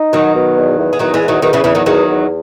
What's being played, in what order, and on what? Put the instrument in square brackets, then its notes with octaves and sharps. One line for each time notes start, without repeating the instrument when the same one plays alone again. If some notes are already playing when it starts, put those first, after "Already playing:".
Already playing: [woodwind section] D#4
[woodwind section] B2 [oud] D#3 F#3
[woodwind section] B2
E2
E2
[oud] G#3
[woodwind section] E2 [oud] D#3 F#3
[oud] E3 G#3
[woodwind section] E2
[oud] D#3 F#3
[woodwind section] E2 [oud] D#3 F#3
[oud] C#3 E3
[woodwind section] E2 [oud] C#3 E3
[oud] D#3 F#3
[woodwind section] E2 [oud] D#3 F#3
[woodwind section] E2